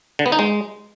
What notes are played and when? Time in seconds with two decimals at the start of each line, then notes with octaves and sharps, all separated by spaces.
0.19 D3
0.26 B3
0.32 D#4
0.39 G#3